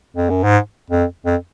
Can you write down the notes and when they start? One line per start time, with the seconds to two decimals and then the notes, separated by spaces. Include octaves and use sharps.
0.16 F2
0.30 F#2
0.44 G#2
0.90 F2
1.26 F2